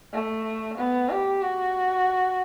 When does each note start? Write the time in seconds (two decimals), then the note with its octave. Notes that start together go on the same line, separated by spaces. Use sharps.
0.13 A3
0.78 B3
1.10 G4
1.42 F#4